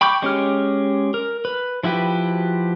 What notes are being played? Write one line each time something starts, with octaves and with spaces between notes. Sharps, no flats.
G5 B5 C#6 D6 G6
G#3 C#4 G4 F6
A#4
B4
F3 E4 F#4 G4 B4